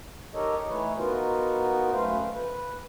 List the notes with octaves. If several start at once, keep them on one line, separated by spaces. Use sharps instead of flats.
D#4 G4 A4 A#4 C#5 D#5
E3 A3 D#4 E4 B4 C#5
B3 D#4 F4 F#4 A#4 B4
F#2 A3 B4 C5 F5
B4